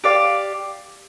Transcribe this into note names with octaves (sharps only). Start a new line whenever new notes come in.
G4 D5 F5